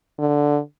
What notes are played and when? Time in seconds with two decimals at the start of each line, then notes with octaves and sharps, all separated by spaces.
0.19 D3